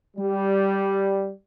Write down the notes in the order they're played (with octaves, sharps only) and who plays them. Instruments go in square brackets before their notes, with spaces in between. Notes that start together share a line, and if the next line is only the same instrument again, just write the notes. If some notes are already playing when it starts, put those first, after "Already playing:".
[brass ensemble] G3